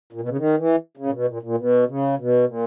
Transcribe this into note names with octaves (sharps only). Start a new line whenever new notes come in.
A#2
B2
C#3
D#3
E3
C#3
A#2
B2
A#2
A#2
B2
C#3
B2
A#2